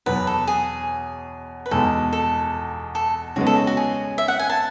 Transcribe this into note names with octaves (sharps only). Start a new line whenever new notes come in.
E2 B2 F#3 B4
A4
G#4
B4
E2 B2 G#3 A4
A4
A4
C#3 G#3 B3 F#4
A4
F#4
F#4
G#4
E5
F#5
G#5
A5